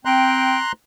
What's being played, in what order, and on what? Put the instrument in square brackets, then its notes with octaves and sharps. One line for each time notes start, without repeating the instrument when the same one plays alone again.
[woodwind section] C4 G5 [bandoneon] A#5 C6 F#6